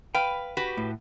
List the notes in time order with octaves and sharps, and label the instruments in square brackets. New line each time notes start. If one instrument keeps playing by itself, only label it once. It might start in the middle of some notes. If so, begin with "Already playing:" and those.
[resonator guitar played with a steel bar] B4 F5 [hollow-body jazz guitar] G5
[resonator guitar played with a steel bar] F#4 G4 B4
[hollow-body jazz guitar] A2